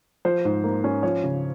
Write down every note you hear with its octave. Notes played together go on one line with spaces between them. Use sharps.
F3 C5
G#2
A#3
C#4
F3 C#5
C#3